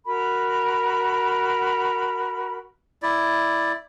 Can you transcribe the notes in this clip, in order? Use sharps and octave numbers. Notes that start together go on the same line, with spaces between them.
F#4 A#4 B5
E4 D5